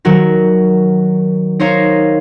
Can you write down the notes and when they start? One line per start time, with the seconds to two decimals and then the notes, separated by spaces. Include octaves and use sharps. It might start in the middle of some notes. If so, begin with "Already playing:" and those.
0.05 D#3 F#3 F#4 A#4
1.60 D#4 A#4 C5 C#5 D#5 F5